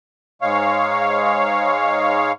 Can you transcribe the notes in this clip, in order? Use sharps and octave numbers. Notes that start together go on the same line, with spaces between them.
G#2 G#3 C#5 F5